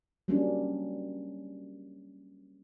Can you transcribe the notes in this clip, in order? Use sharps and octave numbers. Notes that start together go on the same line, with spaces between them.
F#3 G3 A#3 C#4 D4